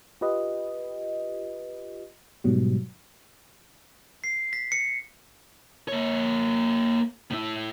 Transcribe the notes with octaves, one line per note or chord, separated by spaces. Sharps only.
F4 G4 B4 D#5
G#2 B2 F#3 G3
C7
B6
C#7
A#3 C#5
A2 E4